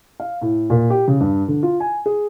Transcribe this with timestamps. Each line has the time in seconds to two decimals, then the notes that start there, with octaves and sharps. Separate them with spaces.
0.20 F5
0.41 A2
0.70 A#2
0.90 G4
1.08 C#3
1.20 G2
1.48 D3
1.63 F4
1.80 G#5
2.06 G#4